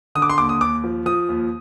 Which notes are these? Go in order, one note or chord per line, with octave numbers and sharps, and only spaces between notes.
D3 D#6
D6
C6
D#2 D6
D#6
D#2 D6
F3
F3 D#6
D#2